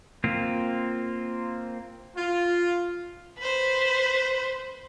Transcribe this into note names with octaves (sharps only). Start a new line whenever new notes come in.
A#3 C4 F4
F4
B4 C5